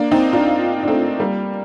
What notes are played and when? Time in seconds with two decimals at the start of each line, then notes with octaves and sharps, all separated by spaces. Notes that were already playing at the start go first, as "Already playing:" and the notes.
Already playing: A#3 D4
0.11 C4 D#4
0.33 D4 F4
0.83 D4
0.88 A3 C4
1.20 G3 A#3